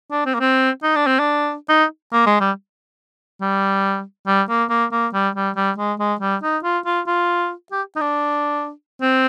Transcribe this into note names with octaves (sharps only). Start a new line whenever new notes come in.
D4
C4
A#3
C4
D#4
D4
C4
D4
D#4
A#3
G#3
G3
G3
G3
A#3
A#3
A#3
G3
G3
G3
G#3
G#3
G3
D#4
F4
F4
F4
G4
D#4
D4
C4